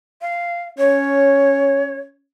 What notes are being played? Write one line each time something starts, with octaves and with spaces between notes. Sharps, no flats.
F5
C#4 C#5